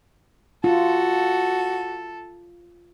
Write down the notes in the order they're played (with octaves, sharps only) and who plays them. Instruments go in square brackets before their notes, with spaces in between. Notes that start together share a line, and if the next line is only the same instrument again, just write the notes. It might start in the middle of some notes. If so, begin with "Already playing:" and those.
[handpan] F4 [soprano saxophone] F#4 [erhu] A4